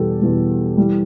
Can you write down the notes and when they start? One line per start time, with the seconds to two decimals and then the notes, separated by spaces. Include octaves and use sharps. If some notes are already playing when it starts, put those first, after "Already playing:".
Already playing: E2 B2 G3 G4 A4
0.21 E2 B2 G3
0.77 E3 G3